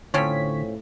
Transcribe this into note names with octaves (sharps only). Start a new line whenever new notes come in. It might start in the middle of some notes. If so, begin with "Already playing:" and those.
A2 D3 F3 C4 C#4 C#5 B6